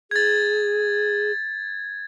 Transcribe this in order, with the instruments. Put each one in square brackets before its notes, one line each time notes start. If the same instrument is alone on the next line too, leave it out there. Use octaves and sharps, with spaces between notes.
[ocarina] G#4 [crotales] G#6 A6